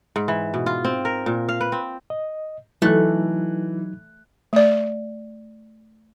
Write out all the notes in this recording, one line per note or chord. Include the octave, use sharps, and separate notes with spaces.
G#2
E3
B2
F4
C4
A#4
A#2
F5
B4
C4
D#5
E3 F#3 A3 D#4 F#6
A3 D5